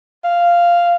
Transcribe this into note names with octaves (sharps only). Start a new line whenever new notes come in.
F5